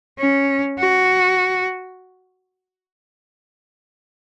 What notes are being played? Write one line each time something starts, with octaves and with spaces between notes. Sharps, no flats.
C#4
F#4